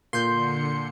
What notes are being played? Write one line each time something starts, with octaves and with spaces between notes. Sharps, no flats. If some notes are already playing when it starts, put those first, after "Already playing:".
A#2 D3 C6 G6 C#7